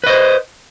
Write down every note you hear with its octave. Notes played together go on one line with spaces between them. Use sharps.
B4 C5 D#5